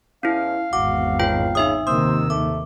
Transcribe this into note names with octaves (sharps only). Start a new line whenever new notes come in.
E2 C#4 E4 F5
G#1 E2 F#4 D6
C#2 F4 G5
C#3 D#4 E5 D#6
D#2 C3 D#3 C5 D#6 E6
A3 D6